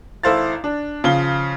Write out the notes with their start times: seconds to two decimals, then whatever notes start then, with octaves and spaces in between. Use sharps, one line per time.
0.23 G#1 E4 A4 C5 F5 A6
0.64 D4
1.04 C#3 F3 F4 G7